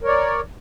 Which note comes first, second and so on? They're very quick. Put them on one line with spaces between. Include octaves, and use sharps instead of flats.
A#4 C#5 D5